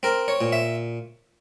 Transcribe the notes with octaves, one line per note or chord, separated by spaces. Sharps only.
C4 A#4
C#5
A#2
E5